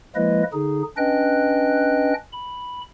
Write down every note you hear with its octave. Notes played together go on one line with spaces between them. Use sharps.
F3 G#3 A#3 E4 B4 D#5
D3 D#4 G#4
C#4 D4 B4 D#5 G5 F#6
B5